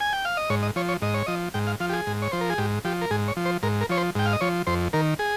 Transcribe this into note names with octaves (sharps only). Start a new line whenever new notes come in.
G#5
G5
F5
D#5
G#2 C#5
D#5
F3 C#5
C#5
G#2 D#5
C#5
F3 D#5
G#2 G5
F5
F3 F5
G4
G#4
G#2
C#5
F3 C5
A#4
G#4
G#2 G4
F3 G4
A#4
G#2 G#4
C#5
F3
C5
G#2 A#4
A#4
F3 C#5
C5
G#2 G5
F5
D#5
F3 C#5
F2 C5
D#3 A#4
G#4